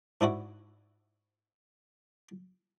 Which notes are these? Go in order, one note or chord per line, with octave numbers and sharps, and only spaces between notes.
G#2 D4 E4 F#4